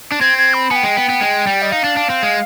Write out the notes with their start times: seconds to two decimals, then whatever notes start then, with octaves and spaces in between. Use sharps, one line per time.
0.12 D4
0.21 C4 G#6
0.38 G#6
0.54 B5
0.71 B3 G#5
0.75 G5
0.83 G#3
0.97 B3
1.09 B3
1.21 G#3
1.47 G3
1.62 D#5
1.72 D#4 F5
1.84 D4
1.97 D4
2.10 C4
2.23 G#3